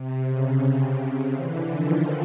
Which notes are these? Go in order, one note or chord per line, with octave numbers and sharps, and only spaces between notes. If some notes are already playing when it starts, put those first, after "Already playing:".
Already playing: C3
C#3
D3 E3
D#3 F3